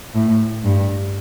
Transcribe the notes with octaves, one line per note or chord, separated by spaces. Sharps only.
A2
G2